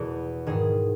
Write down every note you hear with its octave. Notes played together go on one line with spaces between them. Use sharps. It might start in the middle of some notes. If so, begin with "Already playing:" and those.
Already playing: E2 B2 G#4
G#2 D#3 G#4